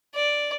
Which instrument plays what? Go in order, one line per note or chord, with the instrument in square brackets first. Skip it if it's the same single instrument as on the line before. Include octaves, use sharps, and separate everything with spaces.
[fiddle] D5